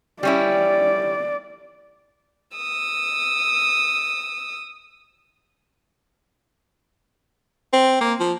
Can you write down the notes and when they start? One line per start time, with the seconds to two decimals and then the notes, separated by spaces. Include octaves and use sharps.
0.23 G3 C#4 E4 D5
2.57 D#6 E6
7.73 C4
8.01 A#3
8.20 F3